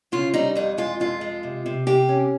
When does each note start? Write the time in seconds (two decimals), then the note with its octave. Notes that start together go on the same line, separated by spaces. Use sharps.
0.12 C#3 F4
0.34 G3 D#4
0.55 F2 D#4
0.78 G#3 F4
1.00 F2 F4
1.21 G#3
1.43 C3
1.66 C3
1.87 C3 G4
2.09 C#4